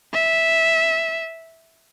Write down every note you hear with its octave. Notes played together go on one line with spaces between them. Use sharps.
E5